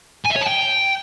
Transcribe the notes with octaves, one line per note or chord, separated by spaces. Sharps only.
G#5
E5
C#5
A5
G5